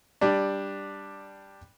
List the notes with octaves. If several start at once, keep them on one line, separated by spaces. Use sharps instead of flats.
G3 D4